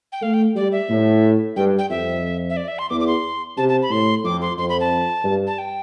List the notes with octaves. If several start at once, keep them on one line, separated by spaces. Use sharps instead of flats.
G5
A3 F5
G5
G3 D5
E5
A2
G2 G5
G5
F2 E5
E5
D5
E5
C6
E2 D6
D6
C6
C3 A5
A5
B5
A2 C6
F2 D6
C6
F2 C6
B5
A5
G2
A5
G5